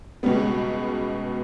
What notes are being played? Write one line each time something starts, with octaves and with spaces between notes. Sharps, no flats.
C#2 B2 G3 B3